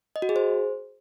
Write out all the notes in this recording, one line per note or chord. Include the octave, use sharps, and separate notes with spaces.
D#5
F#4
G#4
C5